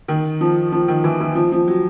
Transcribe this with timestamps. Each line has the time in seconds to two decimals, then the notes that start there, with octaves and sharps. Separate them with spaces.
0.08 D#3
0.41 F3
0.72 F3
0.88 D#3
1.04 E3
1.20 E3
1.35 F3
1.52 F3
1.68 F#3